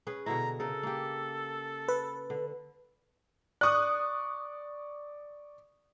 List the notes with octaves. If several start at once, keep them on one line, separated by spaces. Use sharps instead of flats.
C#4 G#4 B4
B2 D3 E4 A#5
C#3 A4 A#4
A#3 G4
B4
D3
D5 C#6 D#6 F#6